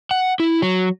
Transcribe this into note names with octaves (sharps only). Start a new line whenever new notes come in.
F#5
E4
F#3